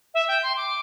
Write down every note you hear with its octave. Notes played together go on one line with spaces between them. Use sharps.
E5
G5
C6
D6